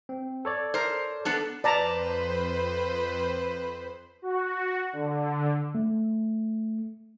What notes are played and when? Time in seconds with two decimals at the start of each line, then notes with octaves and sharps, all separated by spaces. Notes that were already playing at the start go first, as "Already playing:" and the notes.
0.09 C4
0.45 A4 C#5 D5
0.74 A#4 C5
1.25 B3 D4 A4
1.64 F2 B4 C5 D5 A5 A#5
4.22 F#4
4.93 D3
5.75 A3